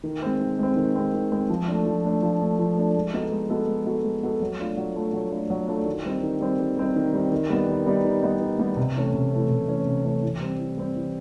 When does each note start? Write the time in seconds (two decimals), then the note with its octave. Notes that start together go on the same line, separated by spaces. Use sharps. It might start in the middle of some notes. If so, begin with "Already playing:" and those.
0.04 D#3
0.22 G#3 C4
0.41 D#3
0.59 G#3 C4
0.76 D#3
0.96 G#3 C4
1.13 D#3
1.32 G#3 C4
1.50 F3
1.68 A3 D4
1.86 F3
2.04 A3 D4
2.22 F3
2.41 A3 D4
2.59 F3
2.77 A3 D4
2.96 G#3
3.13 B3 D#4 F#4 A4
3.32 G#3
3.50 B3 D#4 F#4 A4
3.68 G#3
3.86 B3 D#4 F#4 A4
4.04 G#3
4.23 B3 D#4 F#4 A4
4.41 F#3
4.59 A3 D4 F4
4.77 F#3
4.95 A3 D4 F4
5.13 F#3
5.31 A3 D4 F4
5.50 F#3
5.68 A3 D4 F4
5.86 D#3
6.05 G3 C4 D#4
6.23 D#3
6.41 G3 C4 D#4
6.59 D#3
6.77 G3 C4 D#4
6.96 D#3
7.13 G3 C4 D#4
7.31 D#3
7.50 G3 B3 D#4
7.68 D#3
7.86 G3 B3 D#4
8.04 D#3
8.22 G3 B3 D#4
8.41 D#3
8.59 G3 B3 D#4
8.77 C3
8.96 E3 A3 C#4
9.14 C3
9.33 E3 A3 C#4
9.50 C3
9.69 E3 A3 C#4
9.86 C3
10.05 E3 A3 C#4
10.23 E3
10.41 G3 C4
10.59 E3
10.78 G3 C4
10.96 E3